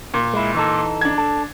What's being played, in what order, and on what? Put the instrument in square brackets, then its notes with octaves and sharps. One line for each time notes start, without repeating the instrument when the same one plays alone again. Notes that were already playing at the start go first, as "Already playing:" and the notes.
[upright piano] A#2
[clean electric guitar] G#3 E4
E3 D#4 A4
[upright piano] D4 G#6
[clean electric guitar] A4